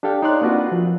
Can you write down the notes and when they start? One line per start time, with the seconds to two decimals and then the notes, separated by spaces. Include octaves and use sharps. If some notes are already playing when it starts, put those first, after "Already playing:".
0.03 D4 G4 A4 F5 G5
0.22 D#4 C#5 D5 C6 F#6
0.41 A#3 C4 D4 F4 F#4 B4
0.72 F3